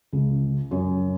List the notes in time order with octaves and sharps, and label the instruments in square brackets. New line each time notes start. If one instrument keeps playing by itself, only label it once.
[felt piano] C#2
F#2